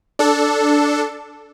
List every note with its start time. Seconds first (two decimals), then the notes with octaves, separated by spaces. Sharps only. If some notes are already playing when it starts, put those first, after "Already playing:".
0.19 D4 A4